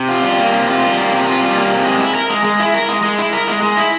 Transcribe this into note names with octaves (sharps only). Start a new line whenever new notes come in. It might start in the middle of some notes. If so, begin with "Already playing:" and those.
Already playing: C3
F4
G3
A#3
C3
F4
G3
A#3
C3
F4
G3
A#3
C3
G#3
E4
A#4
G#3
G#3
E4
A#4
G#3
G#3
E4
A#4
G#3
G#3
E4